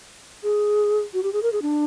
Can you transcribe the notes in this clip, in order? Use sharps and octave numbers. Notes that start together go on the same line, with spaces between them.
G#4
F#4
G4
G#4
A#4
G#4
D4